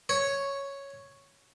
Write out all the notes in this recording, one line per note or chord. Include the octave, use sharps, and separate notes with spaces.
C#5